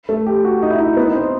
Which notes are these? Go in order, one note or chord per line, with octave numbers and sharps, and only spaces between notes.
A3
G4
F#4
D#4
E4
D#4
B3
D#4
C4